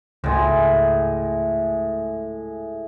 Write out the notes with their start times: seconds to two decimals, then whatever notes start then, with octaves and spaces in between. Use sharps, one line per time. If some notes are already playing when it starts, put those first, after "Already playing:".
0.24 G#1 C#2 A2 G#3 G#5